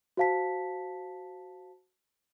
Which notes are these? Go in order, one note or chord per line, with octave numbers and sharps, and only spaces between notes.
F#4 C5 F5 A5 B6